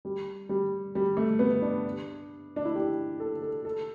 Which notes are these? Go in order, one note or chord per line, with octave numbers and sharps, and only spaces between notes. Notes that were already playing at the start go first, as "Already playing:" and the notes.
G3
G3
G3
A3
B3
D4
D4
E4
G4
A4
A4
A4